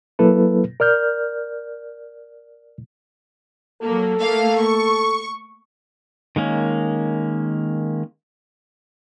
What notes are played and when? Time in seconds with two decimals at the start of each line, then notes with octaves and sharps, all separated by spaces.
0.19 F#3 A#3 E4 A4 B4
0.80 A#4 D5 F6 G6
3.83 F#3 A#3 A4
4.21 A3 A#3 F5
4.62 C#6
6.36 D#3 G#3 A#3 C#4